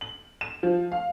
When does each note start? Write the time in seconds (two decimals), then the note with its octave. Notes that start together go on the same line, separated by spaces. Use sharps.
0.01 F#7
0.41 E7
0.63 F3
0.92 F5